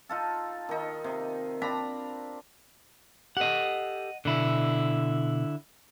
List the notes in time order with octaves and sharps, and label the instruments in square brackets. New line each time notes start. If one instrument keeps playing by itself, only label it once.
[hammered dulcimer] D#4 F4 A4
D#3 D#4
C3
C4 D4 A#5 B5
[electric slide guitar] G4 A4 [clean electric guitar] D#5 F#5
[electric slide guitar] B2 [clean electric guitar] D3 E4